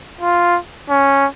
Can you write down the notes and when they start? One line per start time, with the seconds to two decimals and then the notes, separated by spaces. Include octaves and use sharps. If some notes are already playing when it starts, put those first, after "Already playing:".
0.21 F4
0.90 C#4